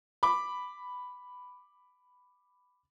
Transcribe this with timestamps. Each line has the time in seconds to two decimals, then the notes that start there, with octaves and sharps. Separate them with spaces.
0.23 B5 D6